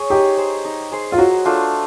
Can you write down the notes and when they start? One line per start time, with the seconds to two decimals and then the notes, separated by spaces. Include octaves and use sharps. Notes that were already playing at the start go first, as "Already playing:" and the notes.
Already playing: G#4 C#5
0.10 D#4 G4
0.37 G#4 C5
0.65 D#4
0.92 G#4 C5
1.12 F4
1.18 F#3 F#4
1.45 A3 D4 F4